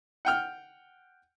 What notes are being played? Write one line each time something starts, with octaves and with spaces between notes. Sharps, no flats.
F#5 G5 F6